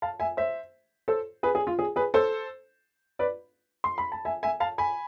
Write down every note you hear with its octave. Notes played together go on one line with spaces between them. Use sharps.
F5 A5
E5 G#5
C5 E5
A4 C5
G#4 B4
G#4
F4
G#4
G#4 B4
A4 C5
B4 D5
C6
B5
A5
E5 G#5
E5 G#5
F5 A5
G#5 B5